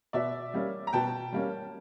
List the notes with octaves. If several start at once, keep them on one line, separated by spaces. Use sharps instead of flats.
B2 D5 E5
G3 A#3 C#4
A#5
B2 G5 A5
G3 A#3 C#4